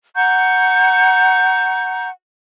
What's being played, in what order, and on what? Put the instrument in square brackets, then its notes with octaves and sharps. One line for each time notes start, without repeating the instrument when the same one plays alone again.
[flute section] F#5 A#5 C#6 G6